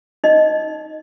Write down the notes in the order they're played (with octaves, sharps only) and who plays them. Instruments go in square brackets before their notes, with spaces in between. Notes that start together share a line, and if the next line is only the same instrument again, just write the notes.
[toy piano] D#4 D#5